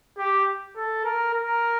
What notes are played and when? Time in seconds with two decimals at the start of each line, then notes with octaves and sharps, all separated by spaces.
0.18 G4
0.76 A4
1.04 A#4
1.34 A#4